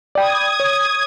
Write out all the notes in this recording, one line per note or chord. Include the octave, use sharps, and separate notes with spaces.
D5 G5 B5 D#6 G#6
C#5